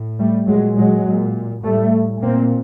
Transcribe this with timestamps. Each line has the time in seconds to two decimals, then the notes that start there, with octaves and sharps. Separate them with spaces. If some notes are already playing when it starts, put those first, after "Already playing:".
Already playing: A2
0.18 G3 A3
0.47 A#2 F#3 G#3
0.77 F#3 G#3
1.06 A#2
1.63 A2 G3 A3
2.22 A#2 A#3 C4